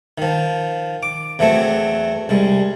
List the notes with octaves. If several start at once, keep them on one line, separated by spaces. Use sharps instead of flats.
D#3 F3
D6
E2 E3 F#3 A3 C4
C2 G3 G#3